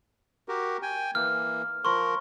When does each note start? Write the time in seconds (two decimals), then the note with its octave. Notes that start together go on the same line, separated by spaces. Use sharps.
0.48 F#4 G4 A#4
0.83 G5 G#5
1.15 E3 A#3 F6
1.85 F3 A#4 C6 C#6